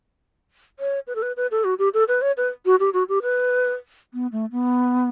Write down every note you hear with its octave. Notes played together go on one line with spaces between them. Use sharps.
C#5
B4
A4
B4
B4
A4
F#4
G4
A4
B4
C#5
B4
F#4
G4
F#4
G4
B4
B3
A3
B3